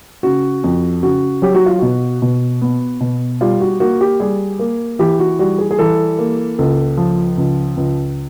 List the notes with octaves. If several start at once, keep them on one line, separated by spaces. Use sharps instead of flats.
C#3 F#4
F2
C#3 F#4
F#3 G4
F#4
F4
B2 F#4
B2
B3
B2
G3 F4
F#4
A#3 F#4
G4
G3 G#4
A#3
E3 G4
F#4
G3 F#4
G#4
G#4
E3 A4
A#3
C#2 A4
F3
C#2
C#2